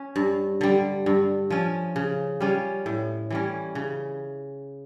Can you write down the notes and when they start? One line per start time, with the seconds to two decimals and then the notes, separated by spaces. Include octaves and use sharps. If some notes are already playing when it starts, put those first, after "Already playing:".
Already playing: C#4
0.16 G2
0.61 D3 G3
1.06 G2
1.50 F3 C#4
1.96 C#3
2.40 G3 C#4 F4
2.86 A2
3.30 E3 G3 C#4
3.75 C#3